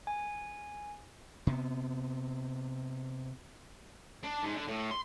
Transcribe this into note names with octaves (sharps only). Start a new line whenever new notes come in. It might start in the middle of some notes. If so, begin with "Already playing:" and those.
G#5
C3 B3
D4
G#2
D3
A2
C6